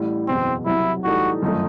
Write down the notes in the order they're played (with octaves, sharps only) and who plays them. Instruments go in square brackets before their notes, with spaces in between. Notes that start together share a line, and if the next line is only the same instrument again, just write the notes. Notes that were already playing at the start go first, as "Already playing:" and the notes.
Already playing: [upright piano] A1 A2 G3
[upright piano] F#1 E2 B2 [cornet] C4
[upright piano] C2 C3 F#3 [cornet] E4
[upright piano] A2 E3 G3 D#4 A4 [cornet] F#4
[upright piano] G1 F#2 D#3 A3 D#4